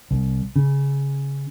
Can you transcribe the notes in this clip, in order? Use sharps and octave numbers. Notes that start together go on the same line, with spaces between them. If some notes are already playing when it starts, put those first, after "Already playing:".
C2
C#3